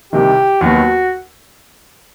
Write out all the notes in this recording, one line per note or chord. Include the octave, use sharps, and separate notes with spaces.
C2 C3 D#3 G4
D#2 D#3 F#3 B3 F#4